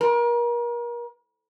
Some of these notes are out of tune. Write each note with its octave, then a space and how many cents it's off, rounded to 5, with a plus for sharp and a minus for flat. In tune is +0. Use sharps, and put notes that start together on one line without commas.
A#4 +35